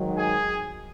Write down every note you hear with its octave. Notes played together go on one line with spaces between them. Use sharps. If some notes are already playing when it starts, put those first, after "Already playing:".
Already playing: G#2 D#3 F#3
G#4 G#5